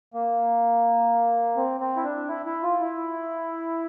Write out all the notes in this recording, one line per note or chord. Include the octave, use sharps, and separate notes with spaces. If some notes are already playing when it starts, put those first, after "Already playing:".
A#3
C4
C4
E4
D4
E4
E4
F4
E4